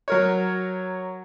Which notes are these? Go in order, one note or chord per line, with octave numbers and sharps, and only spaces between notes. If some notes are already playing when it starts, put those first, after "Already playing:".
F#3 A#4 C#5